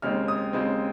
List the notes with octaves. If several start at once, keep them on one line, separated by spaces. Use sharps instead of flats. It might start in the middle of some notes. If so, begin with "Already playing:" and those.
D#2 C#3 G#3 C4 F6
D#6
D#2 C#3 G#3 C4